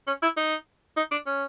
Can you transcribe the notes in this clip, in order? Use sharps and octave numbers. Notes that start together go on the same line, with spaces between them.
C#4
E4
D#4
D#4
D4
C#4